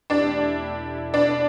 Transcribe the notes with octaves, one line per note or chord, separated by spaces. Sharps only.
E2 B2 A3 D4 E4 G4 D5
B2 B3 D4 E4 B4 D5